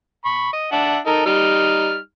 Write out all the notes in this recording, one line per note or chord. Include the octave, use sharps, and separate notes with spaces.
B5 C#6
D#5
D4 E5 F#5
D#4 A4 A#4
G3 D#4 F6